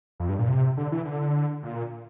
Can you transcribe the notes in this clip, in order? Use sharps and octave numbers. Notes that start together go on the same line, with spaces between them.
F2
G2
A#2
C3
D3
E3
D3
A#2